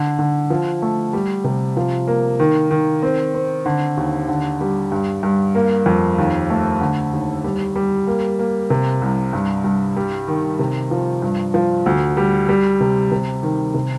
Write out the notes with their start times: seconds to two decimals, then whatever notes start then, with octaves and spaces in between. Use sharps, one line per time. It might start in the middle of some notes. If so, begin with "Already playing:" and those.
Already playing: D3
0.19 D3
0.50 F3
0.82 A3
1.13 G3
1.44 C3
1.77 F3
2.07 A#3
2.40 D#3
2.71 D#3
3.03 C4
3.35 C4
3.66 D3
3.97 D#2
4.29 D3
4.61 G3
4.92 G2
5.23 G2
5.55 A#3
5.86 F2
6.18 D#2
6.50 A3
6.81 D3
7.13 D#2
7.44 G3
7.76 G3
8.07 A#3
8.39 A#3
8.70 C3
9.02 C2
9.33 G2
9.64 G2
9.97 G3
10.28 D#3
10.59 C3
10.91 F3
11.22 G2
11.54 F3
11.86 D2
12.17 G3
12.49 G3
12.80 C3
13.12 C3
13.43 D#3
13.74 C3